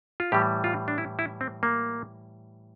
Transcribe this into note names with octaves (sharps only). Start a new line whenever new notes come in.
F4
A2 E3 G3 G4
F4
D4
E4
E4
C4
A#3